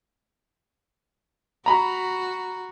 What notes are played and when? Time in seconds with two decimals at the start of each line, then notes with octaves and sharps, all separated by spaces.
1.66 F#4 A#5 B5